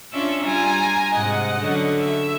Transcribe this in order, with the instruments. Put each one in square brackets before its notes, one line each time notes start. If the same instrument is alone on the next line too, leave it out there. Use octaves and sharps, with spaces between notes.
[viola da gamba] C#4 D4 F4 [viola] E5
[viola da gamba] G3 F4 [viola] G#5 A#5
[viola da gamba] G#2 C3 [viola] D#5 F#5
[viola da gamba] D3 F#3 C#4
[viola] E5